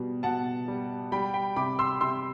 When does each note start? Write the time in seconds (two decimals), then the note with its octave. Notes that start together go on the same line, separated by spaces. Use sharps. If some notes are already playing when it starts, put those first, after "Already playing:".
Already playing: B2 G3
0.23 B2 F#5 A5
0.68 G3
1.12 G3 G5 B5
1.34 G5 B5
1.56 C3 B5 D6
1.79 C6 E6
2.01 C3 C6 E6